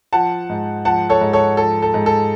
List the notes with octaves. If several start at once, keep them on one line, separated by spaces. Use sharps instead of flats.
F3 F#5 A5
G#2
F3 F#5 A5
A4 C#5
G#2
A4 C#5
F3 A4
A4
G#2
A4